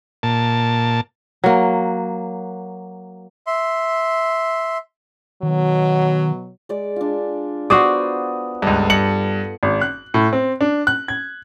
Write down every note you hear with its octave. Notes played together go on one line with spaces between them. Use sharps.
A#2 A5
F#3 A#3
E5 C6
B2 D#3 F#3
G#3 D5 D6
D4 F4
B3 F#4 C5 D5 D#6
C#2 G2 A4
G2 C#7 F#7
G#1
F#6
A2
C4
D4
F#6
G#6